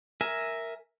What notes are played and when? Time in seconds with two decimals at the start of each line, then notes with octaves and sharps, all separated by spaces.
0.21 A#4 E5 G#5